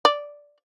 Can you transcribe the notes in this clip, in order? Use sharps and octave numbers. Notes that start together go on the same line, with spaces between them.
D5